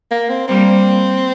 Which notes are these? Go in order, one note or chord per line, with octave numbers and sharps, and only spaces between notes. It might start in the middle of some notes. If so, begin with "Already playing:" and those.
A#3
C4
G3 A#3 C4